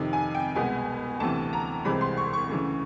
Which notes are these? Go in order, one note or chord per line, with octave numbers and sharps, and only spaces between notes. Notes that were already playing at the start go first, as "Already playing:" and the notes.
Already playing: F2 C3 D#3
G#5
G5
C2 B2 G#3 B3 G#5
D2 C3 E3 A5
A#5
C2 C3 E3 G#3 C4 B5
C6
C#6
C#6
D2 C#3 E3